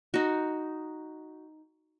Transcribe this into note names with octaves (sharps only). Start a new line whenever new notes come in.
D#4 F#4